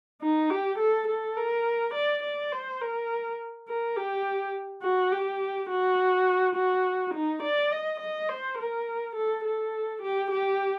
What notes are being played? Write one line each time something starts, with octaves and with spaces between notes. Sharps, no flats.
D#4
G4
A4
A4
A#4
D5
D5
C5
A#4
A#4
G4
F#4
G4
F#4
F#4
D#4
D5
D#5
D#5
C5
A#4
A4
A4
G4
G4